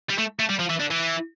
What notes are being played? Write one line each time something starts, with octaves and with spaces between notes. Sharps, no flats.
G3
A3
A3
G3
F3
E3
D3
E3